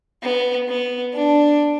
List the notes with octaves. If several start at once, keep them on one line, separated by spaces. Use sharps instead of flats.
B3
B3
D4